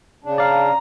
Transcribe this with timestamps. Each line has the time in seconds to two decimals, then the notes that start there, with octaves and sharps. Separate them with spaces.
0.24 C#3 D4
0.38 D5 F5 A#5